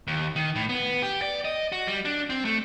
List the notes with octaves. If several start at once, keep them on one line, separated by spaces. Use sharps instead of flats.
D#2
D#3
A2
B3
G4
D5
D#5
F#4
G3
D4
C4
A3